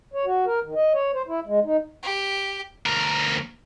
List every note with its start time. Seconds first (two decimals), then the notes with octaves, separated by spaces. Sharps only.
0.14 C#5
0.25 F#4
0.46 A#4
0.63 D#3
0.75 D#5
0.94 C#5
1.14 C5
1.28 E4
1.47 G#3
1.64 D#4
2.03 G4
2.86 D2 A#4